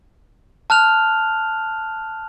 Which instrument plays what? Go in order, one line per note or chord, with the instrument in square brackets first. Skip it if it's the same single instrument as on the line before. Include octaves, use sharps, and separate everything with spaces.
[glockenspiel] A5 F6 F#6 F7